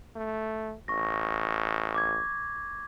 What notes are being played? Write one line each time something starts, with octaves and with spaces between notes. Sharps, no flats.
A3
A1 C#6 A#6
D6 G#6